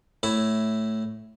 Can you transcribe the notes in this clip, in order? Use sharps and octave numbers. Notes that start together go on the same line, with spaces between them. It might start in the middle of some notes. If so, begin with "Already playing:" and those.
A2 E4 C#5 E5